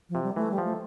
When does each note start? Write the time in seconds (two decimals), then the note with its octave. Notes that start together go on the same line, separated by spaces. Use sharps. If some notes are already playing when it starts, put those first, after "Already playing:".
0.10 F3
0.15 C3
0.24 G3
0.36 E3 A3
0.52 G3
0.58 F3
0.65 A3